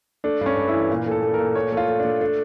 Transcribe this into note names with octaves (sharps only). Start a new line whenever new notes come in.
A3 D4
G2 D4
C#4
G2
E4
E3
A#2
A3 A4
A3
A#4
A#2
A3 C#5
A3 F4
A3
D4
A3
A3 D4